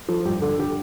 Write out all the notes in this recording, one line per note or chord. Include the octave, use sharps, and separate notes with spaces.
F3 A4
G2 G4
D3 A4
D3 G4